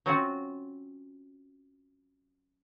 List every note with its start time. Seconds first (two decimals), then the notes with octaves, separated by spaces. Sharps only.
0.06 F#3 C4 C#4 F4 F#4